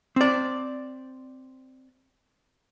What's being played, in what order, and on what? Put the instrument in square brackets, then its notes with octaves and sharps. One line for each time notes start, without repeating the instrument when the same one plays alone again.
[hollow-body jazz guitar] C4 D5